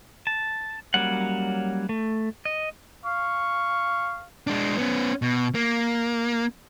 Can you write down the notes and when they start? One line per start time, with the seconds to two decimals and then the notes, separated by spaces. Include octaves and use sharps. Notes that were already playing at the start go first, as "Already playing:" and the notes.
0.27 A5
0.94 F#3 G3 A#3 C#4 F#5
1.89 A3
2.45 D#5
3.05 F5 C#6
4.47 G#3 D4
4.78 B3 C#4
5.22 B2
5.55 A#3